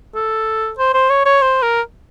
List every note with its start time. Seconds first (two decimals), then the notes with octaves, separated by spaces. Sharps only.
0.15 A4
0.78 C5
0.94 C5
1.10 C#5
1.25 C#5
1.42 C5
1.62 A#4